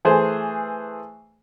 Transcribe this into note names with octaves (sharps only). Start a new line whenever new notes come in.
E3 A3 G#4 C5